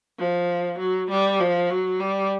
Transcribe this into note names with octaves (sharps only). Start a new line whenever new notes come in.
F3
F#3
G3
F3
F#3
G3